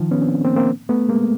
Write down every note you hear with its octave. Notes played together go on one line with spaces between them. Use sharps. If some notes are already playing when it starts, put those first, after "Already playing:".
Already playing: D#3 F3
B3 C#4
C4 D4
A#3 C4
A#3 C4
A3 B3
G#3 A#3